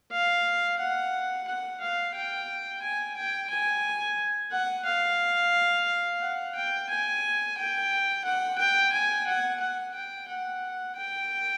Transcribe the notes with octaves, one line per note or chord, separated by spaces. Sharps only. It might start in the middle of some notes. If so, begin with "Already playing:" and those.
F5
F#5
F#5
F5
G5
G#5
G5
G#5
F#5
F5
F#5
G5
G#5
G5
F#5
G5
G#5
F#5
F#5
G5
F#5
G5